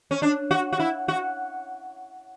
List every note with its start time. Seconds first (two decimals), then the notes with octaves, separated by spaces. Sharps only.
0.11 C#4
0.22 D4
0.51 F#4
0.73 F#4
0.79 E4
1.08 F#4